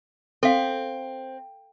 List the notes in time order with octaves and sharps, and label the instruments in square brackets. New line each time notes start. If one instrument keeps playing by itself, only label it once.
[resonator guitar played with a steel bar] C4 [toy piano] A4 F5